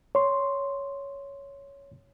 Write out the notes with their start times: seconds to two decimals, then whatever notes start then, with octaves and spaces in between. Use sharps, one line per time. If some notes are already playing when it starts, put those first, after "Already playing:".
0.15 C#5 C6